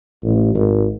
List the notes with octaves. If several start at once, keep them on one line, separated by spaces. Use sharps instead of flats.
A1
G#1